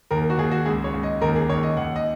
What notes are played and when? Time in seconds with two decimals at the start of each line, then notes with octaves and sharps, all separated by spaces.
0.11 D#2 A#4
0.30 F#4
0.38 D#2 G#4
0.52 F#4
0.65 C#2 G#4
0.84 C#5
0.94 C#2
1.03 D#5
1.22 D#2 A#4
1.36 G#4
1.49 D#2 C#5
1.63 D#5
1.77 D#2 F#5
1.96 D#5